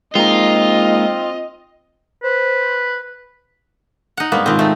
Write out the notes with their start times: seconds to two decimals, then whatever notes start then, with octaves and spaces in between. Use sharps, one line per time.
0.15 G#3 A#3 C4 D#4 F4 D#5
2.24 B4 C5
4.17 D#4 F#5
4.32 G2 G#3 A#3 B3 C#5
4.46 G#2 B2 D#3 C4 F4
4.59 A3 D#4